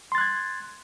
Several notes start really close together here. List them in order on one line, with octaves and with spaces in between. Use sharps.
C6 A6 F#6 G#6